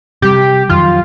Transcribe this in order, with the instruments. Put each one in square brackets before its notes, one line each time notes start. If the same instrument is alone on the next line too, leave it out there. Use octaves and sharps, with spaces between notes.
[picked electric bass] C3 G3 [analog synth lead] G4
[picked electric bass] F2 D#3 F#3 [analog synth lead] F4